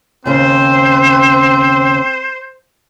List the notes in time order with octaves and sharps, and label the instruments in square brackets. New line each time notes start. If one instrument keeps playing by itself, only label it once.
[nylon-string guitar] D#2 C#3 [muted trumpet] C4 [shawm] C5